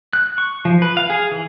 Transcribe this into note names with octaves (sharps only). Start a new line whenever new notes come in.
F#6
C#6
F3
B4
F5
G#4
E3